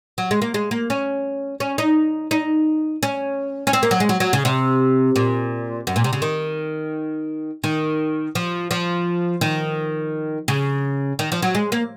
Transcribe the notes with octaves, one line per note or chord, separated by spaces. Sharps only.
F#3
G#3
A#3
G#3
A#3
C#4
C#4
D#4
D#4
C#4
C#4
C4
A#3
F#3
G#3
F#3
F#3
C#3
C3
A#2
F#2
A#2
C3
C#3
D#3
D#3
F3
F3
D#3
C#3
D#3
F3
F#3
G#3
A#3